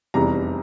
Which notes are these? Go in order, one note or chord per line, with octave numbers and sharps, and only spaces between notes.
F1 E2 C3 E3 G3 A#5